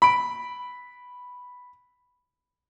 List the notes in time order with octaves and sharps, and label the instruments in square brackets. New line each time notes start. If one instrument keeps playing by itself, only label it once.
[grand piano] B5 D7